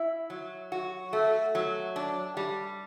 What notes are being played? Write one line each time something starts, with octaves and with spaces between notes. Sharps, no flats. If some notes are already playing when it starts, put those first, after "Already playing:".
Already playing: E4
F#3
F#4
A3
F#3
D4
G3